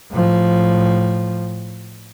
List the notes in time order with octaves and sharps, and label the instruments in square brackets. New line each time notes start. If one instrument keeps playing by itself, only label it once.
[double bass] A2 F3